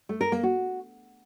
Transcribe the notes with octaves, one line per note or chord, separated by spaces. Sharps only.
A3
A#4
A#3
F#4